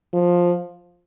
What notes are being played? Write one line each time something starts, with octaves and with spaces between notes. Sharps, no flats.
F3